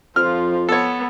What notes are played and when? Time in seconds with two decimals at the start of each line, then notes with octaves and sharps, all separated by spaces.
0.16 F2 F3 F4 F6
0.69 B3 A4 C#5